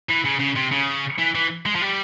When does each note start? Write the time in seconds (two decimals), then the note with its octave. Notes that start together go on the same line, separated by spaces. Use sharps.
0.09 E3
0.24 C#3
0.39 C#3
0.56 C3
0.72 C#3
1.18 E3
1.35 E3
1.66 G#3
1.76 F3
1.82 G3